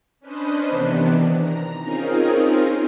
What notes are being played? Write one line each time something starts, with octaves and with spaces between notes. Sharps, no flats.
C#4 D4 B4 C5 D#5
C3 D#3 E3 B3 D4
A#5
C4 C#4 D#4 F4 G#4 A#4